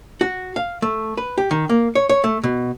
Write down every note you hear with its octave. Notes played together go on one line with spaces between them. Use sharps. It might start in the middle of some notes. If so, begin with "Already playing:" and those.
F#4
F5
A3
B4
G4
D#3
A#3
C#5
C#5
A3
B2